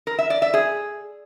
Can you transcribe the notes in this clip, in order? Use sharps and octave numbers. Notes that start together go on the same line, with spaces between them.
A#4
E5
D5
E5
G#4